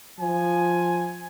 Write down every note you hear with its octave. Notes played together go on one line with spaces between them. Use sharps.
F3 G#5